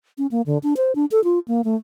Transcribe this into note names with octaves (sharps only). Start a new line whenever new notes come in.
C#4
A#3
D3
D4
C5
D4
A4
F4
A#3
A3